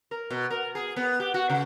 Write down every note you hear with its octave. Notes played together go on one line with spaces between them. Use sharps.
A#4
B2
A#4
G#4
B3
G4
F#4
C#3